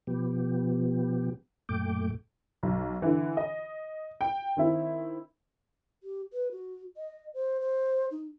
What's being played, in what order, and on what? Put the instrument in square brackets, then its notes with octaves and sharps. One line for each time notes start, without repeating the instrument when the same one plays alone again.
[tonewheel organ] B2 F3 B3 G4
F#2 A#2 A3 G5 D6
[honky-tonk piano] B1
D3 E3
D#5
G5
D#3 C4 E4
[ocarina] G4
B4
F#4
D#5
C5
C5
D#4